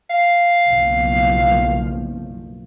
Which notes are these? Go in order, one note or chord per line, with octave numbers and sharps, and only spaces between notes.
F5
F#1 B1 F3